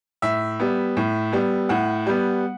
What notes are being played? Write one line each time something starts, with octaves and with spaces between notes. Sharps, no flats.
A2 E5
G3 B3
A2
G3 B3
A2 F#5
G3 B3